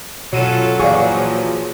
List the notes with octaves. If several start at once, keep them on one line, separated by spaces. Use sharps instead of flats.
B2 F#3 C#4 F4 A4 D#7 E7
A#2 E3 F3 G#4 D5 F5 C#6